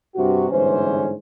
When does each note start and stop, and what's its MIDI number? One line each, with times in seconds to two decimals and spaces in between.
0.16 0.49 43
0.16 0.49 48
0.16 0.49 66
0.50 1.12 31
0.50 1.12 44
0.50 1.12 47
0.50 1.12 52
0.50 1.12 61
0.50 1.12 72